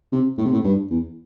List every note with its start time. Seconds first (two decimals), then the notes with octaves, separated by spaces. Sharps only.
0.12 C3
0.38 A2
0.45 C3
0.52 A2
0.64 G2
0.90 E2